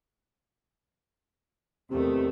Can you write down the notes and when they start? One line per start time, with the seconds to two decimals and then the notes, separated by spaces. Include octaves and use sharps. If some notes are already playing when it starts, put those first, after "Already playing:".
1.90 E2 C3 D#3 A3